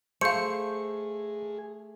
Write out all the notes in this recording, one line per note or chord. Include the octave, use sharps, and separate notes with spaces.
A3 G#4 C5 F5 C#7